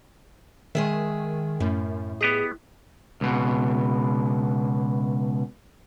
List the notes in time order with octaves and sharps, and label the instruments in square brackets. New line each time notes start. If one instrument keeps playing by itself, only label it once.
[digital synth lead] D#3 [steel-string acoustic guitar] G#3 G#4 E5
[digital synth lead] F#2 [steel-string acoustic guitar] A2
[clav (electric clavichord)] B3 G4 D#5 [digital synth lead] G#4
[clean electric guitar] C#2 B2